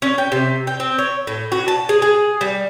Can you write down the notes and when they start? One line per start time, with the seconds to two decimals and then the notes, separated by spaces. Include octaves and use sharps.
0.02 C#4
0.18 G5
0.32 C3
0.67 G5
0.80 C4
0.98 C#5
1.27 A2
1.52 F#4
1.68 A5
1.89 G#4
2.02 G#4
2.41 G3